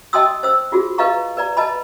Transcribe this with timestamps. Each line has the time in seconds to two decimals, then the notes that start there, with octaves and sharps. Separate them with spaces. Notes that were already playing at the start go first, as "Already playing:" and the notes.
0.13 D#5 G5 A5 C6 D#6 E6
0.43 C5 E6
0.72 F4 F#4 G#4
0.98 B4 D#5 F5 A#5 C#6
1.37 B4 D5 A#5
1.57 B4 D#5 A5 B5